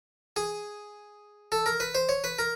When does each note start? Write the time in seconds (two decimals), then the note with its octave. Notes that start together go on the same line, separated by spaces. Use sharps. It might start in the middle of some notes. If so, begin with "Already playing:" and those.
0.36 G#4
1.52 A4
1.66 A#4
1.80 B4
1.95 C5
2.09 C#5
2.24 B4
2.39 A#4